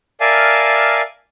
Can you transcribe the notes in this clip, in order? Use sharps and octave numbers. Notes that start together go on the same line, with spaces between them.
A#4 D5 E5 F5 G#5 A5